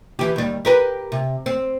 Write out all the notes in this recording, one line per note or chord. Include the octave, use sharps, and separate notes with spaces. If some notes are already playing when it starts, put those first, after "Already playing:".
E3 G4
D#2 G3
G4 A#4 B4
C3
C4